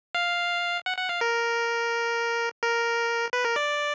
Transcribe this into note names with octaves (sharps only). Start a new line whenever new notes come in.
F5
F#5
F#5
F5
A#4
A#4
B4
A#4
D5